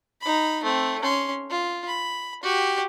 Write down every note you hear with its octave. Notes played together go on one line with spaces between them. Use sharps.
D#4 B5
A3 C4
C#4 C6
F4
B5
F#4 G4